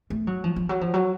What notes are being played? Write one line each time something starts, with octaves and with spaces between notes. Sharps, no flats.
A3
F#3
F3
F3
F#3
F3
F#3